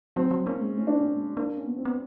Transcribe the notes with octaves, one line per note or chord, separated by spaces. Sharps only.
F#3 C4
F#3
A#3 C#4
G#3
A3 C#4
D4
A#3 C#4
G#3
A#3 D4
C#4
B3
C4
B3